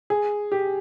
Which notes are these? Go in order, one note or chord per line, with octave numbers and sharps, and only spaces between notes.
G#4
G4